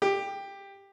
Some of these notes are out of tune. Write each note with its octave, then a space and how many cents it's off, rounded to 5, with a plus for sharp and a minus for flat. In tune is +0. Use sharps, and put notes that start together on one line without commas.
G4 +10